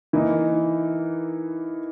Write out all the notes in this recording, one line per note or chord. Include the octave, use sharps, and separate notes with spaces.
E3 A#3 D#4